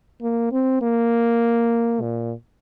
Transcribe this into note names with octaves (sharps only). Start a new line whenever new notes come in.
A#3
C4
A#3
A#2